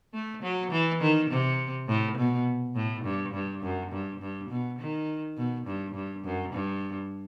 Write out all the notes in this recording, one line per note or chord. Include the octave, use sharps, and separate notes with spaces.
A3
F#3
E3
D#3
C3
A2
B2
A2
G2
G2
F#2
G2
G2
B2
D#3
B2
G2
G2
F#2
G2